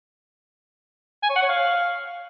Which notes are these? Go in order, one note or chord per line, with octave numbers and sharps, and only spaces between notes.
G#5
C#5
F#5
C#5
F5